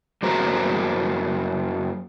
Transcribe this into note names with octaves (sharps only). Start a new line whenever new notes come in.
F#2 A#3 F#4 G#4 C5 A#5